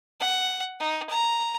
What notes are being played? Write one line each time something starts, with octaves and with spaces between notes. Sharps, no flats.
F#5
D#4
A#5